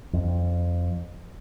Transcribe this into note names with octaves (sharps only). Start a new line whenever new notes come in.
F2